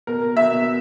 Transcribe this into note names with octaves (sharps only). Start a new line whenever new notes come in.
B2 A#4
B2 E5